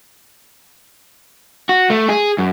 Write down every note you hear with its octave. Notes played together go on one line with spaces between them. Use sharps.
F#4
A3
G#4
F#2